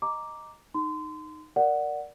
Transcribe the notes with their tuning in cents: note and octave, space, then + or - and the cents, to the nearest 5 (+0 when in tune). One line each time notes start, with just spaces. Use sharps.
D#5 -5 A#5 +0 D6 +0
D#4 -10 C6 -30
A#4 +0 D5 +0 F#5 +0